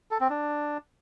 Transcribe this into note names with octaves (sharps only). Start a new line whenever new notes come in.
A4
C4
D4